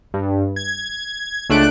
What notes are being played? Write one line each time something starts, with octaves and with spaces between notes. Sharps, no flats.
G2
G#6
C#2 A3 D4 F#6 D7